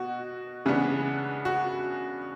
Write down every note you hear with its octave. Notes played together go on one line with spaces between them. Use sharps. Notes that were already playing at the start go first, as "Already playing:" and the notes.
Already playing: B2 F#4
C#3 E3 G#3 B3 D4
F#4